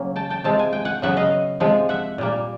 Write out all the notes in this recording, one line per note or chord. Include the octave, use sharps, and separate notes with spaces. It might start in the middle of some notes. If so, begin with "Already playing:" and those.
Already playing: C#3 F#3 A#3 C#4
G5 A5
G5 A5
C3 F3 G#3 A5
G#5
G5
F#5 G#5
C#3 F#3 B3 E5 F#5
D#5 F5
C3 F3 G#3
E5 F#5
A#2 G3 A#3